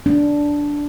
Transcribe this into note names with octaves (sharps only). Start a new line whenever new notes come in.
D4